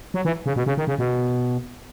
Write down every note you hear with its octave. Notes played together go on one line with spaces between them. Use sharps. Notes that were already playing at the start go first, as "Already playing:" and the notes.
F#3
E3
C#3
B2
C#3
D#3
C#3
B2